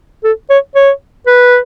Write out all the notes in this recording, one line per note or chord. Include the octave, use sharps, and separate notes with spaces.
A4
C#5
C#5
B4